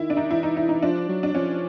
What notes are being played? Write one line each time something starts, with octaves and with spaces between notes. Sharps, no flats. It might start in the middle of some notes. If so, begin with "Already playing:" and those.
Already playing: D#3 E4
D4
D#4
E3 E4
D#4
E4
D#4
F3 D4
F#3
D4
F3 C#4